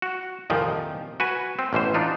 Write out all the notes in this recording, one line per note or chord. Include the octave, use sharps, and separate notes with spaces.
F#4
C2 F2 A#2 D#3 F3
F#4 B4 G#5
C4
A1 B2 E3 C5
D4 D#4 F4